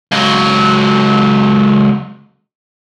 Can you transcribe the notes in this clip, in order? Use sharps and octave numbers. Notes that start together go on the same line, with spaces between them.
C#2 F#3